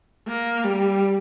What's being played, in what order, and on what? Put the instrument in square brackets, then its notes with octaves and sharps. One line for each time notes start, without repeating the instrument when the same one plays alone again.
[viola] A#3
G3